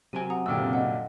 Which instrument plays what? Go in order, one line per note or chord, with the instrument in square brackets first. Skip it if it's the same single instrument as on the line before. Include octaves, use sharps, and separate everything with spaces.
[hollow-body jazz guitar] F#2 F#3 G#5 [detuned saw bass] C3 [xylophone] D7 D#7
[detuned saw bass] C3 [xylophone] F#5 A#5 D#6
[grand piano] F#1 A#2 D3 [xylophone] G5 E6
[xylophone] D#5 F#5